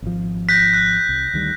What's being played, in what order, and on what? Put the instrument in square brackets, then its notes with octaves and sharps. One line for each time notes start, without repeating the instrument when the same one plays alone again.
[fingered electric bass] G#1 F3
[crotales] F#6 G6 A#6 [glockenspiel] B6
[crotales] F#6
[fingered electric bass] C2
D2 D#3 G3